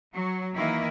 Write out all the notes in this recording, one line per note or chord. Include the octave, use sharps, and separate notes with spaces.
F#3
D#3 E3 A#3 D#4 E4